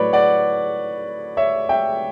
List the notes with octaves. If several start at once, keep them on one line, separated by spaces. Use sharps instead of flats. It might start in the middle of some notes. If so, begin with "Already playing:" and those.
Already playing: A2 F#3 A3 B4 C#5 D5
D5 F#5
C#5 E5
E5 G5